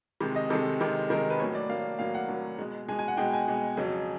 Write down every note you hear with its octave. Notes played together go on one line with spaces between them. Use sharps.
C3 D#3 G#3
D#5
C3 D#3 G#3 A4
C3 D#3 G#3
C3 D#3 G#3 A#4
B4
A2 F#3 A#3 C#5
D5
A2 F#3 A#3 F5
A2 F#3 A#3 F5
F#5
A2 F#3 A#3
B2 G#3
B2 G#3 G#5
G#5
F#5
B2 G#3 G5
G#5
B2 G#3
F2 C#3 F#3